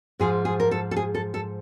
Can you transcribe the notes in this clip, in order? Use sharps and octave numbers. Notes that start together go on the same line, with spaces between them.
G#2 F3 G#4
G#4
A#4
A4
A4
G#4
A4
A4